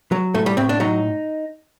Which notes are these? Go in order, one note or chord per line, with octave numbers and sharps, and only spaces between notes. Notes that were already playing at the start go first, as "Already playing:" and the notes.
F#3
A2 A3
G3
A2 C4
D4
F#3 D#4